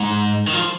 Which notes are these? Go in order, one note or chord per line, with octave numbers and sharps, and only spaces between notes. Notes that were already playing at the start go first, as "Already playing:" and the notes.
Already playing: G#2
D#3
F3